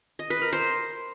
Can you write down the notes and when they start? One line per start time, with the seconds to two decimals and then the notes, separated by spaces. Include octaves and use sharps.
0.19 D#5
0.30 B4
0.41 A#4
0.53 C5